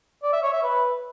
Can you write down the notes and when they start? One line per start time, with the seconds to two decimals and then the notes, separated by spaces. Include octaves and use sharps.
0.23 D5
0.33 E5
0.43 C#5
0.53 E5
0.63 B4